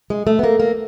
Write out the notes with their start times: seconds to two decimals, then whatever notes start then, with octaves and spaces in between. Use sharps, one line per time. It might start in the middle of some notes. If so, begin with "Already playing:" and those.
0.10 G#3
0.27 A3
0.39 B3
0.43 A#3
0.60 A#3